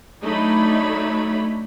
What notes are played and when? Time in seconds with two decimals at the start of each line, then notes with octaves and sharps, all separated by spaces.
0.22 F#3 A3 D4 D#4 C#5 B5